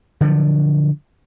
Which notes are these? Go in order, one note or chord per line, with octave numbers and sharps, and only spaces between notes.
D3 F3 F#3